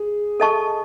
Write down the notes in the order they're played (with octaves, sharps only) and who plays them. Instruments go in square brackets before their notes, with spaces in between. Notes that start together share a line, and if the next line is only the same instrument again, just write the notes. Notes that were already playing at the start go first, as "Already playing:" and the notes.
Already playing: [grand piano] G#4
[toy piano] A4 D#5 A5 C#6